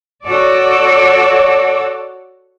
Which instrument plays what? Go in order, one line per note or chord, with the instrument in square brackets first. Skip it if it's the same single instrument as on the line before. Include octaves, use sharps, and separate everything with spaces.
[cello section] F#4 A4 C#5 D5